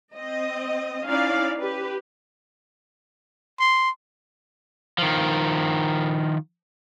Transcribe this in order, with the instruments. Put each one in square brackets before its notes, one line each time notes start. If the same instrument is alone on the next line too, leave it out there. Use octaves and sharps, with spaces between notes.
[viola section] C4 D#5
C#4 D#4 E4 D5 F5
G4 B4
[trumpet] C6
[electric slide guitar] D#3 F3